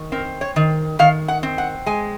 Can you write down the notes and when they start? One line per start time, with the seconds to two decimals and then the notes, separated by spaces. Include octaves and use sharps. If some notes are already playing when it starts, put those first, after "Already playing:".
Already playing: D#3
0.12 C4 A#4
0.41 C#5
0.56 D#3
0.99 D#3 F5
1.28 F#5
1.43 C4
1.58 F#5
1.86 G#3 G#5